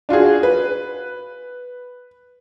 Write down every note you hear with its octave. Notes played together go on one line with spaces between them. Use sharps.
D4 F4 F#4 G#4
B4